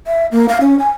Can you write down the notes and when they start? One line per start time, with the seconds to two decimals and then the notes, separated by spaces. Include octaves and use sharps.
0.07 E5
0.32 A#3
0.49 F5
0.61 C#4
0.79 G#5